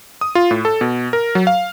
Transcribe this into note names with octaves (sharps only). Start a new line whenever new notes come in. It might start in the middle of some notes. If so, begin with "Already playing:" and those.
D#6
F4
A2
A4
B2
A#4
F#3
F5